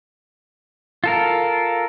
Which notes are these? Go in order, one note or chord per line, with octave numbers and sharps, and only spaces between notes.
F4 A4 A#4